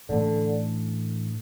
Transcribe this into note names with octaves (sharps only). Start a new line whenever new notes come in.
A2 D3 E3 A3 D4